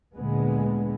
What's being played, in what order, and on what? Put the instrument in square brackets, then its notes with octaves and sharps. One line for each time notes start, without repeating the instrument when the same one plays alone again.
[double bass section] D2 A#2 D3 G#3 B3